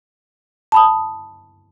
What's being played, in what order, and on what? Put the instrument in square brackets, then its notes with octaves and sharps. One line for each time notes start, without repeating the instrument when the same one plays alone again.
[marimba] A5 B5 D#6